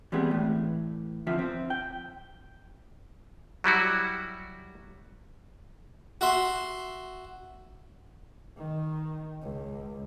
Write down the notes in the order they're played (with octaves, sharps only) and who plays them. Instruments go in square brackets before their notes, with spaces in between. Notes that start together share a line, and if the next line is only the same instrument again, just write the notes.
[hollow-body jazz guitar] E3 G3 G#3 B3 C4 G#4
A2 E3
F2 D3 F3 F4 E5
C4
G5
[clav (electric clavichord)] F#3 G3 E4 F#4
[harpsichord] F#4 E5 C6
[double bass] D#3
C#2